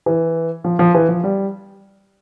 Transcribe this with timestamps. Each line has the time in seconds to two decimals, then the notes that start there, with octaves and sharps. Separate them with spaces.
0.06 E3
0.64 F3
0.79 F3
0.95 E3
1.09 F3
1.24 G3